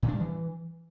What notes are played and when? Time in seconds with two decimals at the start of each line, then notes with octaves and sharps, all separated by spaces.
0.03 A2
0.08 D4
0.14 G3
0.20 E3